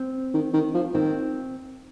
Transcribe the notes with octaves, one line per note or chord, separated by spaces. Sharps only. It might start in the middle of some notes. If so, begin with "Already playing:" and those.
Already playing: C4
D#3
D#3
F3
D#3 C4